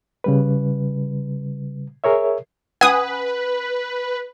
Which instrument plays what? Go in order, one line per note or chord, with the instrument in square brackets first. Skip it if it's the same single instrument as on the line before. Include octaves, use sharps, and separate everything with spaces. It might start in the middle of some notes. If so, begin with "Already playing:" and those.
[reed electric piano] C#3 G3 B4
G#4 A#4 C#5 E5
[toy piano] C#4 F#5 [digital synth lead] B4 [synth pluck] G#5 D#6